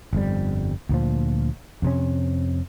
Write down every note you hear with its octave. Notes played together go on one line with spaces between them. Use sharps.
G1 F2 G3
D2 A#2 F3
F2 C3 C#4